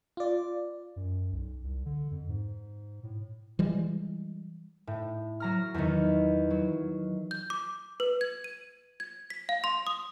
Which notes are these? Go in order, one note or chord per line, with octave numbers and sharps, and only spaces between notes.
F4 D5
F#2
B1
C2
D3
F2
G#2
A2
E3 G3 G#3
A2
F#3 A#5 F6
E2 D#3
F#3
G6
D6
B4
G#6
D#7
G#6
B6
F5
C6
D#6